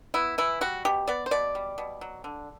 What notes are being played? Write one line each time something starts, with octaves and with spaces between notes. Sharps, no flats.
B3 E4
E3 E4
G3 F#4
B2 G4
B3 D5
C5
B2 D5
G3
B2
F#3
D3